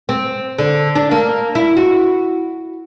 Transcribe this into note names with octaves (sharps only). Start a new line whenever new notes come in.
C4
D3
D4
A#3
E4
F#4